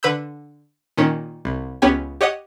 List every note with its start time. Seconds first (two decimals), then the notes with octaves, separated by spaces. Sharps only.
0.03 D3 B4 B5 E6 G6
0.97 A#2 D#3 C#4
1.45 C2
1.82 C#2 B3 C#4 G4 G#5
2.21 G4 C#5 D#5 F#5 D#6